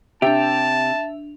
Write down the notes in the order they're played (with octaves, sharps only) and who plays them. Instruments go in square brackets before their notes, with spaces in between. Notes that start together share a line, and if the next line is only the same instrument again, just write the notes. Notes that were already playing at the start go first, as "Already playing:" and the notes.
[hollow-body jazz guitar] C3 G4 [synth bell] D4 F7 [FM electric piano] E5 [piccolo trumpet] A5